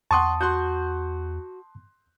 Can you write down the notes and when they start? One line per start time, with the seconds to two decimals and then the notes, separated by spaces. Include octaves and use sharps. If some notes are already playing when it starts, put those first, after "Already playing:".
0.11 E2 F#5 A5 C6 C#6 D#6
0.41 F#4 C6 F#6 G6